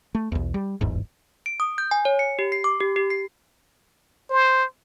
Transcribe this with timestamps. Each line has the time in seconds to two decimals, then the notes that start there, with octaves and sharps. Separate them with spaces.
0.15 A3
0.32 B1 E2
0.54 G3
0.81 D1 G1 E2 G#2
1.46 D7
1.60 D#6
1.78 G6
1.91 G#5
2.05 C#5
2.19 C#7
2.39 G4
2.52 C7
2.64 D6
2.80 G4
2.96 G4
3.10 C7
4.30 C5